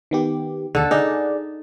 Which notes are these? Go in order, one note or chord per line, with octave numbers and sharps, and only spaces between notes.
D#3 B3 G4
D#2 D3 A4
D#4 G#4 D5 F#5